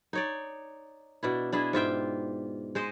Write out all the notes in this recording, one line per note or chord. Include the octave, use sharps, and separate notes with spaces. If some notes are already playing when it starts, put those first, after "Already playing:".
D#4 C#5 D5
B2 D4 E4
D4 E4 G#4
G#2 F4 E5 G5
G#3 C5 D#5